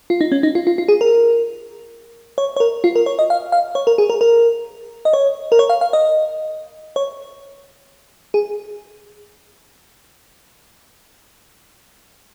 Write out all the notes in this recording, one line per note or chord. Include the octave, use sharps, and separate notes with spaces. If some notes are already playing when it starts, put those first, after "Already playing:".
F4
D#4
C#4
D#4
F4
F4
F4
G#4
A#4
C#5
C#5
A#4
F4
A#4
C#5
D#5
F5
F5
C#5
A#4
G#4
A#4
A#4
D#5
C#5
A#4
C#5
F5
F5
D#5
C#5
G#4